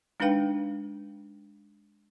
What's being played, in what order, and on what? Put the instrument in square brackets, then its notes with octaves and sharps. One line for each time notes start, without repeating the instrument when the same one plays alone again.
[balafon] G#3 D4 D#4 B4 F5 G5